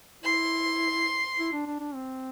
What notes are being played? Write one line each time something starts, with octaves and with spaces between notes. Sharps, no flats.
E4 C6
E4
D4
D4
D4
C4